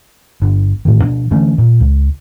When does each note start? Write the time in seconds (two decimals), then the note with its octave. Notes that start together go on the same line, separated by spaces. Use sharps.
0.42 G1 D3
0.85 A1 A2 D#3
1.02 B2 F3 D4
1.31 D3 E3 A3 C#4
1.58 A#2
1.80 C#2